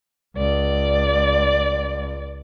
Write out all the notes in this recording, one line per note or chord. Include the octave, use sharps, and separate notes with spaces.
C#2 D5